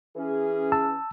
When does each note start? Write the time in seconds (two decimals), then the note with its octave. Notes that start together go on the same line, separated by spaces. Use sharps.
0.16 E3 C#4 G#4
0.72 A5 E6